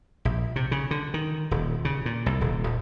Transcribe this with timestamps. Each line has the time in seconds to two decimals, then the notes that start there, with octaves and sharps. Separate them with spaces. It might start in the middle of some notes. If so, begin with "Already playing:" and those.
0.25 A#1
0.56 C3
0.71 C#3
0.91 D3
1.14 D#3
1.51 D#1
1.85 C#3
2.06 A#2
2.26 C2
2.41 D#1
2.64 D#1